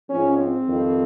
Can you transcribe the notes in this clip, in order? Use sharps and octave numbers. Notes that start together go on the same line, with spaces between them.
G#2 F3 C#4
C4
F2 D#3 G3